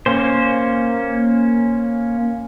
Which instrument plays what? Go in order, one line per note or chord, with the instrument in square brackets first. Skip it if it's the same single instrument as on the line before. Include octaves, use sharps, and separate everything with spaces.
[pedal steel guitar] A#3 C#4 C5